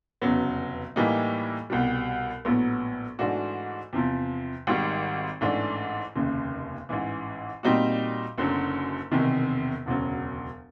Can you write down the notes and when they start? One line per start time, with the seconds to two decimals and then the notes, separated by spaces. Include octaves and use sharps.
0.22 F1 E2 C#3 F#3 B3
0.96 A2 E3 G3 A#3 D#4
1.70 C2 B2 G3
2.45 A#1 A2 F#3 B3
3.19 G#2 E3 A3 D4 F#4
3.93 E2 C3 F3
4.67 G#1 G#2 D#3 G3
5.41 A1 G#2 E3 A3 D4
6.16 F1 D#2 C#3
6.89 A1 G#2 E3
7.63 A#2 G3 C4 D#4 F#4
8.38 F#1 F#2 D3 F#3
9.11 E1 E2 C3 D#3
9.86 E1 D2 C#3 F#3